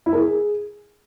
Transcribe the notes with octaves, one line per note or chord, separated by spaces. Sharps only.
E4
A#4
G#4